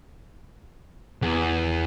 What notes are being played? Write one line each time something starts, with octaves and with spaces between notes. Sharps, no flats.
E2